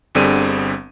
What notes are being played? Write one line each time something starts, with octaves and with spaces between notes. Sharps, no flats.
G1 D3 G3 C4 G#4 D#7